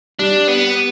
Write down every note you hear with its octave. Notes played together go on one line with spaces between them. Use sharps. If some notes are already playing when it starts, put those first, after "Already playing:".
G3 D4
B3